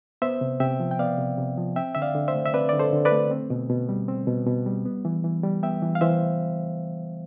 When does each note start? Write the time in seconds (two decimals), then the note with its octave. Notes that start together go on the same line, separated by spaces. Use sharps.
0.22 B3 C5 E5
0.41 C3
0.60 C3 E5 G5
0.80 F3
0.91 G5
0.99 B3 D5 F5
1.18 C3
1.38 C3
1.57 F3
1.76 C4 E5 G5
1.95 D3 E5
2.02 D5 F5
2.15 D3
2.28 C5 E5
2.34 A3
2.46 E5
2.53 C4 B4 D5
2.69 D3 D5
2.79 A4 C5
2.92 D3
3.05 B4 D5
3.12 A3
3.31 C4
3.50 B2
3.70 B2
3.89 G3
4.08 C4
4.27 B2
4.47 B2
4.66 G3
4.85 B3
5.05 E3
5.24 E3
5.43 G3
5.63 B3 E5 G5
5.82 E3
5.95 F5
6.01 E3 C5 E5